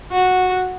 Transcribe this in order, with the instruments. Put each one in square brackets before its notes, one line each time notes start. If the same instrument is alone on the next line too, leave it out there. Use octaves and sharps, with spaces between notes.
[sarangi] F#4